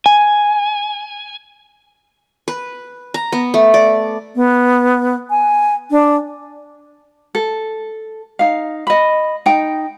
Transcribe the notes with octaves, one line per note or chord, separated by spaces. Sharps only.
G#5
B4
A#5
B3
A3
D5
B3
G#5
D4
A4
D#4 F5
D#5 B5
D#4 G5